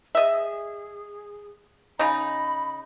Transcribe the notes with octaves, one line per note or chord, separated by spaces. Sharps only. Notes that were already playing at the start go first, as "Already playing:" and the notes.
G#4 D#5 E5
C#3 D#4 B5